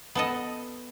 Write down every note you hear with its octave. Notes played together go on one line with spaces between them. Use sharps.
B3 A4 D#5